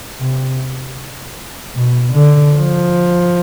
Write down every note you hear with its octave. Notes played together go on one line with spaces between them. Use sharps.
C3
B2
D3
F3